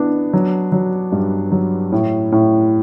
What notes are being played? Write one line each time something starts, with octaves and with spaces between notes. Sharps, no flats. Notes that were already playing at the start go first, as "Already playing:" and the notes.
Already playing: E3 B3 D4
F#3
F#3
G2
F#3
A2
A2